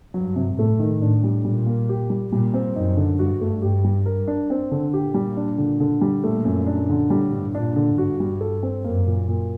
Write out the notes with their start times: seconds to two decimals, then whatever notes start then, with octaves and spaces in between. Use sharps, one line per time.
0.14 G2 F#3
0.36 C3
0.58 A2 A3
0.79 D#3
1.02 A2 D4
1.23 G3
1.45 A#2 G3
1.66 A#3
1.89 G4
2.10 G3
2.32 A#2 G3
2.54 C4
2.76 F#2 D#4
2.97 D3
3.19 G2 F#4
3.41 A3
3.62 G2 G4
3.84 G3
4.06 A#4
4.28 D4
4.50 C4
4.71 D3
4.93 A#2 G4
5.14 G3
5.37 D4
5.58 D3
5.80 D3
6.01 G3
6.24 A#2 A3
6.45 F#2
6.67 D4
6.90 D3
7.10 A2 G3
7.32 G2
7.55 A#2 D4
7.76 D3
7.97 G2 F#4
8.20 G3
8.41 A4
8.63 C4
8.84 F#2 A#3
9.07 A#2
9.28 A#2